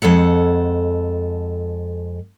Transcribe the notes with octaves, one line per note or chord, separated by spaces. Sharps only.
F2 G#3 A4 F#5